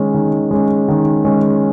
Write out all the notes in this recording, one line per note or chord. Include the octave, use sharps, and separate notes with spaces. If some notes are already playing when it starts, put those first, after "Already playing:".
Already playing: D#3 G#3 C#4
D#3
G#3 C#4
D#3
G#3 C#4